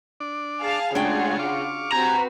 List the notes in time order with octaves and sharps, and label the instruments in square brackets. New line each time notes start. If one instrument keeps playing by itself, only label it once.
[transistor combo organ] D4 D5
[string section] G#4 F5 A5
[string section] C#3 F4 F#4 [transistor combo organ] G#3 A3 G#4 [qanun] D4 G5
[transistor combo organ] F5 C#6 D6
[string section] C4 F#4 B4 [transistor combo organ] G4 G#5 [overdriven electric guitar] A#5